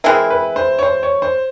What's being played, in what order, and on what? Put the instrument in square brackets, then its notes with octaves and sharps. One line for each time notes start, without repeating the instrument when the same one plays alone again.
[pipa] E3 G#3 C4 E4 [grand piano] A#4
[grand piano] B4
C5
C#5
C5
C#5
C5